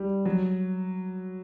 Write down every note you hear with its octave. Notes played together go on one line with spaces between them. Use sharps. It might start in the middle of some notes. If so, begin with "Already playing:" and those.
Already playing: G3
F#3